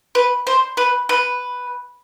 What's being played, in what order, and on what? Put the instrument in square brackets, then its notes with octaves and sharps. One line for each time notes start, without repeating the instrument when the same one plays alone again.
[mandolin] B4
C5
B4
B4